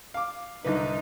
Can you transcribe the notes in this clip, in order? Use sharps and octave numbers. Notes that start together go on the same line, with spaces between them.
F5 D6
C2 D3 D#4 B4